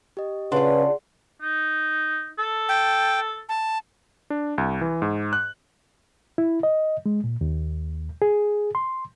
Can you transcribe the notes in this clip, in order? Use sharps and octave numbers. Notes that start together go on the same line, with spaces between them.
G4 D#5
C#3 D4 F4 G#4 B4 F#5 C6
D#4
A4
G5
A5
D4
C2
E3
G#2
F#6
E4
D#5
G#3
A#2
D#2
G#4
C6